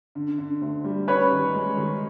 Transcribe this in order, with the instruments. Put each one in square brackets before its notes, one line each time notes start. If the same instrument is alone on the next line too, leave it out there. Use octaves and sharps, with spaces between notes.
[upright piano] D3
D3
D2
G3
[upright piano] C#4 [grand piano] B4 C#5
[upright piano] D#3
G#3
D#3